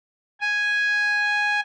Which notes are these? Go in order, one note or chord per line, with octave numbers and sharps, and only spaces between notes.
G#5